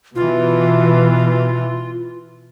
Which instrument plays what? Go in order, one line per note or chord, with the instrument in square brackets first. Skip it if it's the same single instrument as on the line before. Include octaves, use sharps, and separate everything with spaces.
[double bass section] B2 E3 [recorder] F4